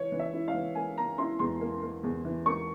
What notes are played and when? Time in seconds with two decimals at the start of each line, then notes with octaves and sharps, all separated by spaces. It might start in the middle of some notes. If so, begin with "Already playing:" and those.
Already playing: E3 C#5
0.12 E3
0.19 E5
0.33 E4
0.48 F5
0.54 E3
0.75 A#3 G#5
0.98 A#3 A#5
1.18 E4 C6
1.39 E2 C6
1.61 A#3
1.82 A#3
2.04 E2
2.25 E3
2.46 A#3 C#6